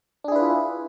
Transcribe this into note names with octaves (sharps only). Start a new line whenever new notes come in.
D4 E4 F4 G#4 B4